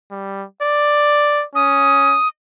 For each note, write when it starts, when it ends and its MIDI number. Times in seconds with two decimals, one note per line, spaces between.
0.11 0.44 55
0.63 1.45 74
1.55 2.17 61
1.55 2.28 87